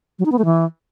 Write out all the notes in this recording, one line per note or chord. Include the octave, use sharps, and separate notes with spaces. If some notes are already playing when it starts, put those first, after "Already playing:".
F#3
D#4
B3
A3
E3